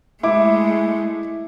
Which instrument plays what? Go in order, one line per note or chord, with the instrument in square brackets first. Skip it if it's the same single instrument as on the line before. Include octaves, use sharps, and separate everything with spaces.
[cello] G#3 A3 [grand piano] E4 D6